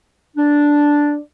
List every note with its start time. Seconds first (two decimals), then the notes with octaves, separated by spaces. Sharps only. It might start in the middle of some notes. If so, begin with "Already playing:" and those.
0.37 D4